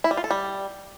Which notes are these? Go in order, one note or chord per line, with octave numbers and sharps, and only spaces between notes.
E4
G3
F4
A4
G3